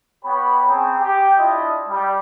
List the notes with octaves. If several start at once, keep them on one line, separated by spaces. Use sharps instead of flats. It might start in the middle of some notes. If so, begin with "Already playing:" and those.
B3 G4 C#5 B5
C4 C#4 G#4 G5 A#5
G4
D4 E4 F4 D#5
G3